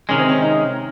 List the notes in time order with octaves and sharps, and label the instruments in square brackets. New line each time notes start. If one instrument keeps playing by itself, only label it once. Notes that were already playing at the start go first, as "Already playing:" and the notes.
[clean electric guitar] C3 D#3 G#3 [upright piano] C#4
[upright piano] C4
C#4
D#4